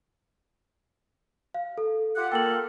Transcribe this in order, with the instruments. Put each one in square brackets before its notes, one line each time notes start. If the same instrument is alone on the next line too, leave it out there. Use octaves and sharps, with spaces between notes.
[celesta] F5
A4
[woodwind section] F4 G4 F#5
[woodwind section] A#3 F4 A4 [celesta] G5 F#7